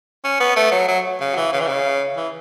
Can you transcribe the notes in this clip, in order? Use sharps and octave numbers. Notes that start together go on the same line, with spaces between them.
C#4
B3
A3
F#3
F#3
C#3
F#3
E3
C#3
E3
C#3
E3